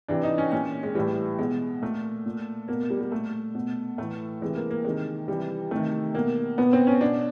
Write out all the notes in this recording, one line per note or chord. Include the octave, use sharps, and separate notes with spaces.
C3 E3 D4
D#4
C#4
A#2 C#4
G#3
A2 E3 G3
B2 G#3
A#2 A3
A#2
B2 A#3
G3
G3
A#2 A3
B2
A2 E3 A3
C3 E3 G#3
A#3
A#3
C3 D#3 G#3
C3 E3 G3
C3 D#3 A3
B2 A#3
B2 B3
C4
C#4
B2 D4